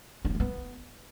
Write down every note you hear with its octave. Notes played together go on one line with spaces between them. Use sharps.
D4
C4
A3
B3